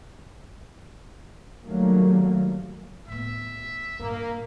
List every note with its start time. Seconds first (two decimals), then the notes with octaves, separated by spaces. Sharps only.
1.67 D#3 F#3 G3 A3 A#3
3.08 A2 B3 E5
4.00 G2 A#2 A#3